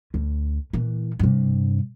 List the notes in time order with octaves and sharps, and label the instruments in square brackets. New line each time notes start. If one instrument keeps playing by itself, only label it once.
[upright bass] D2
A#2 E3
G2 C3